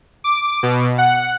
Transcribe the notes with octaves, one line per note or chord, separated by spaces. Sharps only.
D6
B2
F#5